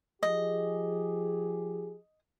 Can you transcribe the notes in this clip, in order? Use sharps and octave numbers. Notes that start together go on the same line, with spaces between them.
F3 G4 G#4 D#5